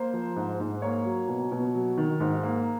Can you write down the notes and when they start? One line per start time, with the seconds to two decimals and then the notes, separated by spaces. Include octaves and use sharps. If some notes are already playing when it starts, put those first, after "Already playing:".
Already playing: A#3 C5
0.13 F3
0.36 G#2
0.60 G#2
0.82 A#3 C#5
1.05 F#3
1.28 B2
1.51 B2
1.75 F#3
1.98 D#3
2.20 G#2
2.43 A#3